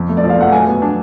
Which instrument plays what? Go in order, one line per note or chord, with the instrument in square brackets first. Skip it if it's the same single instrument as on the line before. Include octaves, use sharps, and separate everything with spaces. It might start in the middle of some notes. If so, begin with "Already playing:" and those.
Already playing: [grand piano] F2
A3
[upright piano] D5
[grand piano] F3
[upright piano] F5
[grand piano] A3 [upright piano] F#5
[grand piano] F#3 [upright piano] G#5
[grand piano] B3
D4